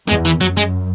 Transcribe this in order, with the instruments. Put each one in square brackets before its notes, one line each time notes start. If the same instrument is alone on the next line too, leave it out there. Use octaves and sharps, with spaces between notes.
[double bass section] E2 [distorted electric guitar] G#3
[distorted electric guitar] E3
[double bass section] F#2 [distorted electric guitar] F#3
[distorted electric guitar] G#3